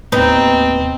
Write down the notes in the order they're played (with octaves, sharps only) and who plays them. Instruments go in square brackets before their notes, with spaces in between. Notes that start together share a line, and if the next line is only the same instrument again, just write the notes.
[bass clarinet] D#2 [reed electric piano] A2 B3 B4 [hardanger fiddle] C4 [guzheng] D#4